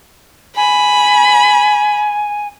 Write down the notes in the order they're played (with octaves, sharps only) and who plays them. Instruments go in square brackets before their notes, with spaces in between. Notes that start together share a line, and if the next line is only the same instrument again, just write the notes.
[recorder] G#5 [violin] B5